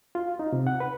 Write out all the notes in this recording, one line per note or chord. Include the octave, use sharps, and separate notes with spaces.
F4
D#4
C3
F#5
B4